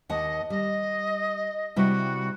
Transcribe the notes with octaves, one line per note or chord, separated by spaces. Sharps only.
D#2 D#5 F#5 A5
G3 D#5
C3 G3 E4 F#4